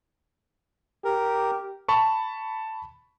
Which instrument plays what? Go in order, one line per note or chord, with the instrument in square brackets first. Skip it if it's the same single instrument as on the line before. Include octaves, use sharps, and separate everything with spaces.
[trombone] G4 [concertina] A#4
[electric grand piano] A5 B5 C#6